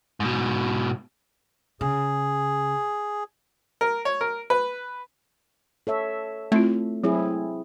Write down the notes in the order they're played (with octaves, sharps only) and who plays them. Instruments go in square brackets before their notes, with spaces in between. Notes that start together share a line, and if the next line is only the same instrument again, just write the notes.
[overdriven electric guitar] G#2 B2
[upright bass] C#3 [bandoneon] G#4
[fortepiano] A#4
C#5
A#4
B4
[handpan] A4 C#5 E5
[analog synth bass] A3 [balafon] C4 E4 F4
[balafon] F#3 [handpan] C4 E4 G#4